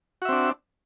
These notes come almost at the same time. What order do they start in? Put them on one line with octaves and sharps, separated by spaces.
F#4 E5 C4 D4